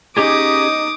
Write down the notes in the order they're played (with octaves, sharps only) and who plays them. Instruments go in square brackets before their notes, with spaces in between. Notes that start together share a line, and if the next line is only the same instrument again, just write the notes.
[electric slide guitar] C#4 G4 G#4 [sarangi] D#4 [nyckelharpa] D6 D#6